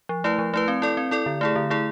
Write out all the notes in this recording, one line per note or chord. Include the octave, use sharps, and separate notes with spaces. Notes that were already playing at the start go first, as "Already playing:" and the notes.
F3
A3 E4 B4
F3
A3 E4 B4
C4
E4 A4 D5
C4
E4 A4 D5
D3
A3 E4 G#4
D3
A3 E4 G#4